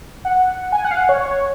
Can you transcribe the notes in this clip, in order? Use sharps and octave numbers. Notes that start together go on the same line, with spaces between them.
F#5
G#5
F#5
F5
F#5
C#5
C#5